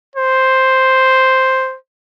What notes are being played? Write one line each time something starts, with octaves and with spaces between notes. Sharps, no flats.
C5